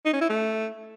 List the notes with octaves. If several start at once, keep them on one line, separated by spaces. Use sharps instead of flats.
D#4
C#4
E4
A3